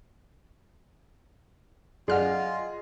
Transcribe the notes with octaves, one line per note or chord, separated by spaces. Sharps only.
F#2 F4 G#4 D5 D#5 F#5 F6